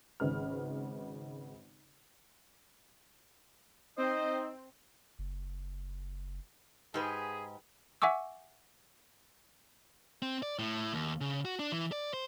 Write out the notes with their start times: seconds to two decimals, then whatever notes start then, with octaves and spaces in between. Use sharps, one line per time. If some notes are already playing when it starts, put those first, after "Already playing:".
0.20 G#1 C#3 B4 F6
3.98 C4 D#4 C5 D#5
5.19 F#1
6.94 G#2 G4 G#4 B4
8.02 E5 F#5 G#5 C#6 D6 E6
10.22 C4
10.43 D5
10.59 A2
10.93 D#2
11.21 C#3
11.45 F#4
11.59 D4
11.72 E3
11.92 D5
12.14 C5